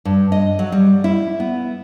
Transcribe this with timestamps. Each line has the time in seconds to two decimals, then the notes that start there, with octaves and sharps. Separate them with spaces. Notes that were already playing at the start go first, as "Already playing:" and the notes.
0.05 G2
0.32 D#5
0.59 F#3
0.72 G3
1.04 E4
1.40 B3